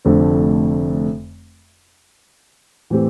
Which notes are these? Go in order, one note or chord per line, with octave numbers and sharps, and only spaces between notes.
F1 F2 D3 A3 C4
A2 E3 A3 C4 G4